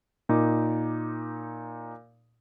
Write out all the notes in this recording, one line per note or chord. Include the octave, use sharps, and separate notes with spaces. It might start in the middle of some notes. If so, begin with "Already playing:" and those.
A#2 D#4 D6